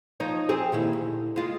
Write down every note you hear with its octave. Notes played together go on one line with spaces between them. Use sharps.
F3 D#4 C#5
C4 G4 G#4
A#2 D#3 E4
D2
G#3 F4